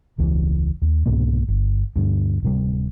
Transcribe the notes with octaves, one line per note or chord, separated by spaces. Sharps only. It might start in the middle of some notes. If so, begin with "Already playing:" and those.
E1 C#2 E3
D#2
C2 G#2 B2 A#3
G1
D2 G2
D1 C3 G3